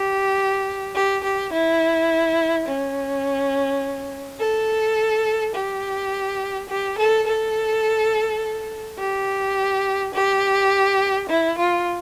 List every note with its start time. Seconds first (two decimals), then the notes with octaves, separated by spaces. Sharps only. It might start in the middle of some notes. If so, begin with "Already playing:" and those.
Already playing: G4
0.95 G4
1.23 G4
1.52 E4
2.66 C#4
4.39 A4
5.54 G4
6.69 G4
6.97 A4
7.26 A4
8.99 G4
10.13 G4
11.28 E4
11.57 F4